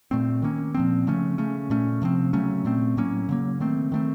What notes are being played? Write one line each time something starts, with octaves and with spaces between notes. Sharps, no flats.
A#2 A3 C4
D#3 A#3 C#4
A#2 F3 C4
C#3 F3 A3 C#4
C#3 A3 C#4
A#2 A3 C#4
C3 F3 C4
C#3 F#3 A3 C#4
A#2 A3 C4
A2 F#3 A#3 C#4
C#3 F#3 A#3
D#3 A3 C4
D#3 A3 C4